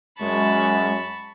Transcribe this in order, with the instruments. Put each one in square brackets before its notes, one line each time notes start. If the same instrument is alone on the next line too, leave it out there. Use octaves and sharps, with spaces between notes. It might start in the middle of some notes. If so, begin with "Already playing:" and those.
[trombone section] F#2 [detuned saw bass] G#3 [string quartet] A5 B5 C#6